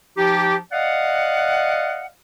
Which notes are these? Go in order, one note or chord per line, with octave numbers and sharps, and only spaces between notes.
F3 D#4 G4
D5 D#5 F5 F#5